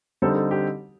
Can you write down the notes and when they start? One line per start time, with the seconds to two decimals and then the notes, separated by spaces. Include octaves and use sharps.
0.22 D3 G3 C4 D#4 A4
0.36 A4
0.51 G4